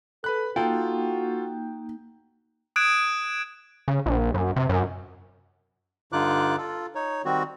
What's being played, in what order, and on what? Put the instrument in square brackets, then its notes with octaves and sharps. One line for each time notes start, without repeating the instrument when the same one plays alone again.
[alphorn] A4 [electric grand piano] B4 B5 F#6
[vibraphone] A#3 D#4 [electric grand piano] F4 A4 [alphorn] F#4 [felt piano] G5
[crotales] D#6 F#6 G#6 D7 E7
[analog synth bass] C#3
A#1
F#2
C3
F#2
[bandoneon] G2 D3 D#4 F4 D6 F#6
F4 A4
D#4 C#5
D#3 G3 C4 F#4